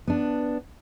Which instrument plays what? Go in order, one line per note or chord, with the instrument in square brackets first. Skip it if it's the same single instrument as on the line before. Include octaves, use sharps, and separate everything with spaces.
[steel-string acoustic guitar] B3 D4